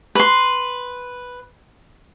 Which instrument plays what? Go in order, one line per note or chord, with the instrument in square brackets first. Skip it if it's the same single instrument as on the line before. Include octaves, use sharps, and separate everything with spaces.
[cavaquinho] B4 C6